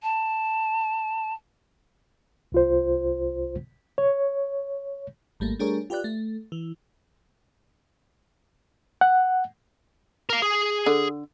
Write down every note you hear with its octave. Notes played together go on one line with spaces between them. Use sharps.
A5
C2 F4 C5
C#5
G#1 G3 A3 A#3
G3 A3 D4 G#4 A#4 C#5
F4 G4 B4 D5 F#6
A3
E3
F#5
A#4 F5
G#4
D3